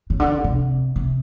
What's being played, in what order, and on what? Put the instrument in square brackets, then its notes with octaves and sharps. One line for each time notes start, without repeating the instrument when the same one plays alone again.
[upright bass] C#3
D3
C3
C3